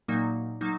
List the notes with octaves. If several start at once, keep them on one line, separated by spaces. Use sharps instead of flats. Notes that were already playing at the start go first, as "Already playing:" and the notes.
A#2 F#3 A#3 D#4
F#3 A#3 D#4